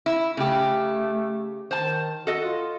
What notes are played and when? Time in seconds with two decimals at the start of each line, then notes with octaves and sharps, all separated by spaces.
0.06 E4
0.37 C#3 A3 G4
1.71 D#3 C5 A5
2.27 F#4 A4 D#5
2.44 F4